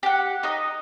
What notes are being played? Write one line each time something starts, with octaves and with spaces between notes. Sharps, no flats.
G4 F#5
D#4 D#5